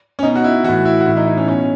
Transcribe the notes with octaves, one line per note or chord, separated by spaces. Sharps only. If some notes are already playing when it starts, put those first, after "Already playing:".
C#4
B2 D#4
F#4
E4
A2 E3 F#4
E4
F#4
A2 E3 E4
D#4
D#4
C#4
B2 C#4